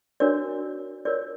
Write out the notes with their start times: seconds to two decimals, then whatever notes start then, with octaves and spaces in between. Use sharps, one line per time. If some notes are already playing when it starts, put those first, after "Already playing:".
0.20 D4 F#4 A#4 C#5 D5
1.05 F4 A#4 C#5 D5